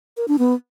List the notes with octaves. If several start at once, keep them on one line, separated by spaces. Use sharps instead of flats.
A#4
D4
B3